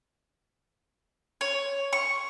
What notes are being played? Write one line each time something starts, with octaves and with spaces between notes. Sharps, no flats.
C#5
C#6